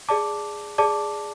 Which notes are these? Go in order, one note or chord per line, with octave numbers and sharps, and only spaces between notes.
G#4 D5 A5 D6
G#4 D5 A5 D6